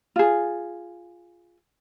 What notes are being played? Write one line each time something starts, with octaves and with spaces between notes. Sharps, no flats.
F4 G#4